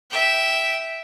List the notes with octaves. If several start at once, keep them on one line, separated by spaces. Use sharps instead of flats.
E5 G5